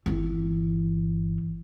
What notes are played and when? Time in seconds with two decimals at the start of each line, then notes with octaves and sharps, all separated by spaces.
0.06 G1 E3